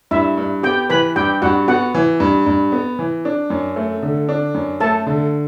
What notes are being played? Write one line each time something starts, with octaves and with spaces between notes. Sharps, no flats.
G2 E4 E5
G2
B3 G4 G5
E3 B4 B5
G2 G4 G5
G2 F#4 F#5
B3 F#4 F#5
E3
G2
G2
B3
E3
D4
F#2
A3
D3
D4
F#2
A3 A4 A5
D3